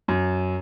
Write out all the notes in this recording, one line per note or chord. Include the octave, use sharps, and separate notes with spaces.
F#2